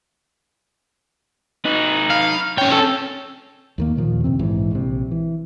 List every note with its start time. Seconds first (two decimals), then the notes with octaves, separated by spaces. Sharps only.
1.65 D#4 B4
2.10 F5
2.58 C#4 C#5 G5
2.72 A4
3.78 D#2 D#3 A#3
3.96 D#2 A#2 D#3 F3
4.24 F2 C3 C4
4.39 A#1 G#2 E3
4.71 A#1 C3
5.11 E3